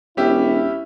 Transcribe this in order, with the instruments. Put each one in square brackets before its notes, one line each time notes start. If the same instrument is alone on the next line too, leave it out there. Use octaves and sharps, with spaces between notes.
[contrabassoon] E1 [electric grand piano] C#4 G4 E5 [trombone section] E4